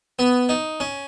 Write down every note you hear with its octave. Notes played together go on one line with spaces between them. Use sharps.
B3
D#4
C#4